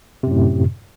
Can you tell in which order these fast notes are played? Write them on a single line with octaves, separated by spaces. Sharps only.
C3 F#2 A2